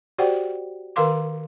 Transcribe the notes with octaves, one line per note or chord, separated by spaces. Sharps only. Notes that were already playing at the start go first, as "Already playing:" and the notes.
F#4 G4 C5 D5 F#5 G5
D#3 A#4 B4 F5 C6 D6